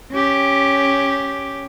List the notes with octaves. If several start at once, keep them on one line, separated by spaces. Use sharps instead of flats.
C#4 G4